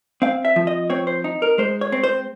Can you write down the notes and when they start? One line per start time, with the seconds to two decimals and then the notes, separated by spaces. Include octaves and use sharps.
0.22 C4 F5
0.45 E5
0.56 F3
0.67 D#5
0.90 C4 C#5
1.07 C5
1.24 D#4
1.42 A#4
1.58 G#3 C5
1.81 C#5
1.92 C4
2.03 C5